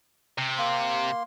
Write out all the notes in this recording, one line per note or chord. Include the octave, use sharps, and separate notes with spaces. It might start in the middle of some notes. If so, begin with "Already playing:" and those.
C3
A#3 C6